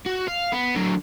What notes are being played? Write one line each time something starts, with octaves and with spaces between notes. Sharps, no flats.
F#4
F5
B3
D3 F#3